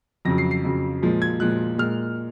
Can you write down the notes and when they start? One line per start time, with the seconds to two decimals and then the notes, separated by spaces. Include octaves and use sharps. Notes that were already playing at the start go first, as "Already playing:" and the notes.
0.25 F2 C#3 F#3 A#6
0.38 C7
0.51 C7
0.64 F2 C#3 F#3
1.02 A#2 F3 G#3
1.22 G#6
1.40 A#2 F3 G#3 F#6
1.78 A#2 G#3 F6